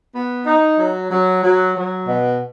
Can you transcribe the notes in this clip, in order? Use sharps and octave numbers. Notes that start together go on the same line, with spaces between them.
B3
D#4
F#3
F#3
F#3
F#3
B2